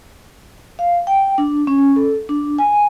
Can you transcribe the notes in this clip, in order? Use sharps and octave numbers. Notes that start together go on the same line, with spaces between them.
F5
G5
D4
C#4
A4
D4
G#5